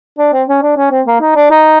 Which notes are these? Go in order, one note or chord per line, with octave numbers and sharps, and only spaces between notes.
D4
C4
C#4
D4
C#4
C4
A#3
D#4
D4
D#4